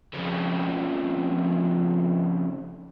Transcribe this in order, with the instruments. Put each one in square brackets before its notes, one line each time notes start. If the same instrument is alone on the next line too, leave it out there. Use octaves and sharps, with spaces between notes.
[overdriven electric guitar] F2 C#3